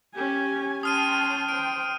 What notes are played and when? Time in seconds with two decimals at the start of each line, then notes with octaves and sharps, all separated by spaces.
0.15 C#4 G4 G#5
0.83 C#4 G5 A5 C6 D#6 F6 D#7
1.49 C5 G5 D7